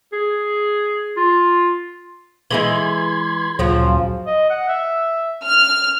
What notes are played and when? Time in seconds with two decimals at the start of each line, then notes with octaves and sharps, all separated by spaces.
0.12 G#4
1.17 F4
2.51 E3 G#3 E4 B5 C6 G#6
3.59 D2 A#2 C#3 F3 F#3 F#4
4.26 D#5
4.50 F#5
4.68 E5
5.44 F6